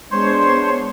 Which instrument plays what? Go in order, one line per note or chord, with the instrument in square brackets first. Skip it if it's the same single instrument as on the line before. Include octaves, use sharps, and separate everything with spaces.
[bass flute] G#3 [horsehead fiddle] B3 D4 [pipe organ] C5 C#5 [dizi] C6